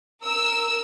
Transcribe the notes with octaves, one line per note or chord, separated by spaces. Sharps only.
A#4 E6